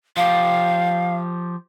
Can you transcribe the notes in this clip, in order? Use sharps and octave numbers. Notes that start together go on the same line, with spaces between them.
F3 G4 F5